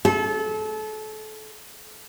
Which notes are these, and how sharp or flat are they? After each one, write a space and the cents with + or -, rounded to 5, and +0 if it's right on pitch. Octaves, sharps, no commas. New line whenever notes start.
A4 -30